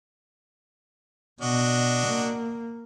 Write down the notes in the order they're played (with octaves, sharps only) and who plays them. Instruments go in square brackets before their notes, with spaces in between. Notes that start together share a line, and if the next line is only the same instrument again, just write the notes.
[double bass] B2 [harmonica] D4 F#4 D#5
[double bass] A#3